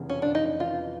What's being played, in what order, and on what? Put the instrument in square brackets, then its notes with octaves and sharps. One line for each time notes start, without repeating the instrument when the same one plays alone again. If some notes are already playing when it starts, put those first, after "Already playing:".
Already playing: [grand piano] F1 E2 C#3
[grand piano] F3 [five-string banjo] C#4
[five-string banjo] D4
[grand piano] C#3
[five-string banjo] D#4
[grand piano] F1
[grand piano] E3 [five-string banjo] F4